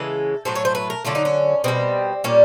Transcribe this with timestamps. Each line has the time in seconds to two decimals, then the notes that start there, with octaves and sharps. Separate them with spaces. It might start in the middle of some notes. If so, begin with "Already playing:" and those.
Already playing: C#3 E3 G#3 A4
0.45 A2 F#3 A3 C5
0.55 C#5
0.65 C5
0.75 B4
0.90 A#4
1.05 D3 F#3 A3 F4
1.15 D#4
1.25 C#4
1.64 B2 G3 C4
2.24 A#2 G3 C#4